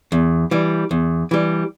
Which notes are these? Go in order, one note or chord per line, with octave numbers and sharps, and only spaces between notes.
E2
E3 G3
E2
E3 G3